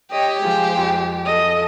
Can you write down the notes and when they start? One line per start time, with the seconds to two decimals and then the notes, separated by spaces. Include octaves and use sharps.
0.11 G4 C#5 D#5
0.42 F3 G#3 F4 G#4 C5
0.77 F2
1.25 A4 D#5